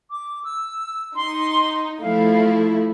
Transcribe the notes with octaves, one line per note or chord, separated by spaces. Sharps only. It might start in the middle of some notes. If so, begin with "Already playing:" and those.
D6
E6
D#4 C6
F3 A3 E4 F5